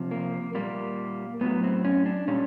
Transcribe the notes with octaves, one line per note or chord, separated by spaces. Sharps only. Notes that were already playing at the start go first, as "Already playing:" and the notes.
Already playing: C3 F3
A#3
A#2 G3 A#3
A2 F#3 B3
C4
C#4
D4
A#2 G3 C#4